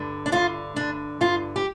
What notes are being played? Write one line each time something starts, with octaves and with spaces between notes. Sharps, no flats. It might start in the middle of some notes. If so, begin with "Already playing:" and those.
Already playing: G2 D3
D4
G2 D3 F4
G2 D3 D4
G2 D3 F4
G4